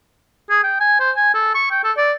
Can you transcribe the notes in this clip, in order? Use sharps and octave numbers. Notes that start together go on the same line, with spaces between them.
G#4
G5
G#5
C5
G#5
A4
C#6
G5
A4
D5